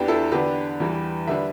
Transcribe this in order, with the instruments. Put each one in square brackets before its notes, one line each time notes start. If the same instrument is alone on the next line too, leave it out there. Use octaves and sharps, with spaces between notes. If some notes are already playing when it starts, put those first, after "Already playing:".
Already playing: [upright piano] E2 E3 B3 D4 G4
E4 A4
D3 B3 D4 G4 B4
E2 E3 G3
D3 G3 D4 B4 E5